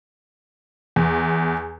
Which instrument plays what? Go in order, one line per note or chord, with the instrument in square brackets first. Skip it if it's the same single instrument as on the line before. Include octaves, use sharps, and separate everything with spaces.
[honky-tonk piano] E2